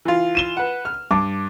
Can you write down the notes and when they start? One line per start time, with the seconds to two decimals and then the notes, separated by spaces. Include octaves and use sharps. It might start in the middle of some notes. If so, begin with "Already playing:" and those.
0.05 E3 F4
0.35 D#7 E7 G7
0.57 B4 F#5
0.85 F6
1.11 G2 A5 D6